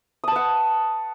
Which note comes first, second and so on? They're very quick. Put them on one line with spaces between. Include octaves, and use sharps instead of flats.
D#6 A5 B4 F#5